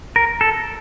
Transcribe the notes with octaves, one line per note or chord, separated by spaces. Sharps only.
A#4
A4